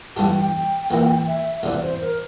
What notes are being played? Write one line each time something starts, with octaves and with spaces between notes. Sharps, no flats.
G2 E3 G3 D4 G4 G5
G5
E2 E3 A#3 E4
E5
E2 C3 E3 D5
C5
A#4